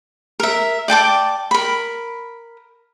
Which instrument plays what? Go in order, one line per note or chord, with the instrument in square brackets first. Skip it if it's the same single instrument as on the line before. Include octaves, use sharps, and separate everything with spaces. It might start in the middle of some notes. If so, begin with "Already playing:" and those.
[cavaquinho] A#4 E5
D5 G5 A5 D6
A#4 B5